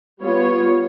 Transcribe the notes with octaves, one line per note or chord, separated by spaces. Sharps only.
G3 B3 F4 C#5